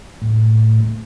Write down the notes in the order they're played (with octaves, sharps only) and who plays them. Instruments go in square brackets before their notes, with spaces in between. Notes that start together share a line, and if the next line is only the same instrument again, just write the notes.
[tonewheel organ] A2